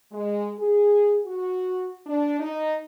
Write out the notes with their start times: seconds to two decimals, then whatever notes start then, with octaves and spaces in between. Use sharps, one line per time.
0.12 G#3
0.58 G#4
1.25 F#4
2.06 D4
2.39 D#4